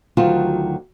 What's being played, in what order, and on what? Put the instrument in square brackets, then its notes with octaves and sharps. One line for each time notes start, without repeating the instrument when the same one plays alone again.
[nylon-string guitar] D2 D#3 F#3 F4 F#4 A5